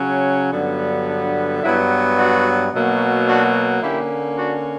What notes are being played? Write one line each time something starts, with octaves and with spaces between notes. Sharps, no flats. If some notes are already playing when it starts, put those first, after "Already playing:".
Already playing: C#3 F#3 C#4
G2 D3 F#3 B3
D4
G2 F#3 B3 E4
D4 F#4
B2 F#3 A#3
D4 F#4
D3 A#3 C#4 E4 G4
D4 F#4